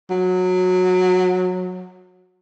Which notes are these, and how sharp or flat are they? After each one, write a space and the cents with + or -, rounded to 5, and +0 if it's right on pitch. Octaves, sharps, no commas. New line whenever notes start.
F#3 -20